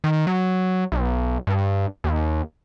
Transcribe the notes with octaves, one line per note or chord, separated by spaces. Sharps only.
D#3
F#3
B1
G2
D#2